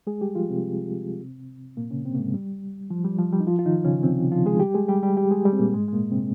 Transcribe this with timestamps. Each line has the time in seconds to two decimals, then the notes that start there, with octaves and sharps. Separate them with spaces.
0.07 G#3 G#4
0.21 G3 G4
0.35 F3 F4
0.49 C3 C4
1.77 A#2 A#3
1.91 C#3 C#4
2.05 C3 C4
2.15 A#3
2.19 G#2 G#3
2.34 G3
2.90 F3
3.05 G3
3.19 F3
3.33 G3
3.40 D#4
3.47 F3 F4
3.59 F4
3.66 D#3 D#4
3.85 C#3 C#4
4.03 C3 C4
4.32 F3 F4
4.46 G#3 G#4
4.60 G3 G4
4.75 G#3 G#4
4.89 G3 G4
5.03 G3 G4
5.17 G3 G4
5.31 G#3 G#4
5.45 G3 G4
5.53 C4
5.59 A#2 A#3
5.74 G#2 G#3
5.88 G#3
5.92 A#2 A#3
6.11 C3 C4